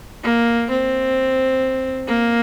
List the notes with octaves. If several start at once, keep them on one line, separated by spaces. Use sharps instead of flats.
A#3
C4
A#3